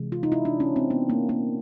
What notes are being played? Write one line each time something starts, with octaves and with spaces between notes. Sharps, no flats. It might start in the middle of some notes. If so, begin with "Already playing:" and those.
Already playing: C3 E3 G#3
F4
D#4
E4
D4
C#4
C4
B3
A#3
A#3